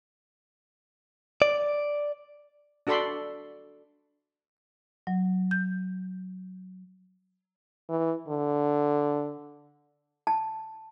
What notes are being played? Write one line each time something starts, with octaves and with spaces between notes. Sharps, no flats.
D5
D4 F#4 A4 D5 B5 C6
F#3
G6
E3
D3
A5